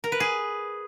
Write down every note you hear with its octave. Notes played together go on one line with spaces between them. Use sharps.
A#4
B4
G#4